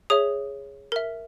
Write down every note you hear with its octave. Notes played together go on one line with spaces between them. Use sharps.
G#4 C#5 E5 D#6
A#4 E5